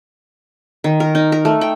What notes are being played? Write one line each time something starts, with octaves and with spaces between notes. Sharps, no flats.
D#3
A#4
D#4
A#4
A3
G5